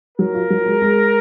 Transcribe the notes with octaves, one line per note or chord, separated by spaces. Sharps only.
F#3 A#4
F4
F#3
G#3
G#3